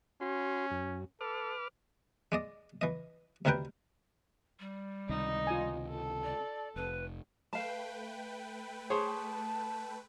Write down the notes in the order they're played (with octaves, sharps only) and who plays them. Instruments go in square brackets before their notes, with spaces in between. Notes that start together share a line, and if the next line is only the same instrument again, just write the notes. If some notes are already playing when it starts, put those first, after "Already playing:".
[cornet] C#4 [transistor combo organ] F#4 C6
[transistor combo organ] F#2
[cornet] A4 [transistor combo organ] B4 D6 F6
[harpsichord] G#3 D5 D#5
E3 D#5
D2 C3 D#3 A#4 B4 G5
[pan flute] G3
[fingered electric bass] C#2 C3 D#3 [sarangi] D#4
[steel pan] F4 G#5
[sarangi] A4
[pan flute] D5
[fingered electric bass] F1 [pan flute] B4
[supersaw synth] A3 B4 G5 [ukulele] F5 A5
[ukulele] G#4 [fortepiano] C5 C#5 [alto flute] A5